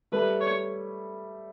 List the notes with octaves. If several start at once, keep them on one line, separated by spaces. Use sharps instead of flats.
G3 A3 B4
C#5